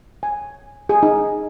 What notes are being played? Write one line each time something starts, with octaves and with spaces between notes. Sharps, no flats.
G#5
G#4
D#4